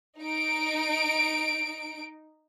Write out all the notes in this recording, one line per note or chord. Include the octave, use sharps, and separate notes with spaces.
D#4 D7